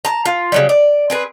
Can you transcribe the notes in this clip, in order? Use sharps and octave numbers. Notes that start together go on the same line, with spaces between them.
A5 A#5
F4
C#3 F#3 G3
D5
C4 G#4 B4